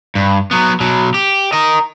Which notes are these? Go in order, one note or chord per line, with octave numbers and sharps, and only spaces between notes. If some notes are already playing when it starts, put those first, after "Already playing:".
G2
F#3 B3
B2 F#3
G4
A#4 D#5